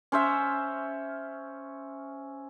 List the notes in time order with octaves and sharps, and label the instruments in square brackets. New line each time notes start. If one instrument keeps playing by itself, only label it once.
[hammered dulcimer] C#4 C5 E5